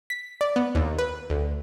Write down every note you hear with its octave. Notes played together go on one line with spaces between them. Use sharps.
B6
D5
B3
D#2
B4
D2